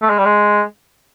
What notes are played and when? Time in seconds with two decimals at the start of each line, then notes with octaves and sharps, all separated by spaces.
0.02 A3
0.10 G#3
0.18 G3
0.25 G#3